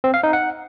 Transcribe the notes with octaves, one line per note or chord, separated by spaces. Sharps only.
C4
F5
D#4
F#5